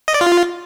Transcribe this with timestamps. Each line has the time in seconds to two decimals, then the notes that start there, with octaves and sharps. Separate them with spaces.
0.08 D#5
0.14 D5
0.21 F4